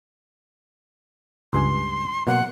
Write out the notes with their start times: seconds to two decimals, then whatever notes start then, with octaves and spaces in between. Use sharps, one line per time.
1.53 C#2 G2 G#5 C6
2.27 B2 F#3 A#3 F#5